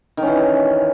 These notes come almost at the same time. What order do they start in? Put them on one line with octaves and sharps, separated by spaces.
D#3 C#4 E3